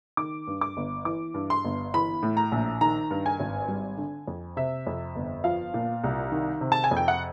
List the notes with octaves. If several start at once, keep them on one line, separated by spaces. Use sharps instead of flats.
D#3 D6
G2
D6
G1
E3 D6
G2
C6
G1
E3 B5
A2
A#5
A#1
D#3 A#5
G2
G#5
G#1
G3
D3
F2
C3 E5
F2
G1
F3 F5
A#2
C2
D#3
C3
A5
G#5
F2
G5
F#5